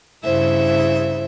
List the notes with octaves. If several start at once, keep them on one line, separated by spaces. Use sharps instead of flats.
G2 C#3 E4 C5 E5